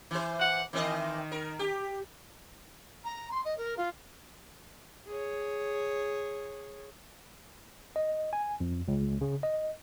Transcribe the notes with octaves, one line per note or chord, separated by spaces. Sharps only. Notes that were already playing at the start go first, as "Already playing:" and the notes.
E3 C5
F#5
D#3 E3 C4 D#5
A#4
G4
A#5
C6
D#5
A#4
F4
G#4 C#5
D#5
G#5
F2
C#2
C#3
D#5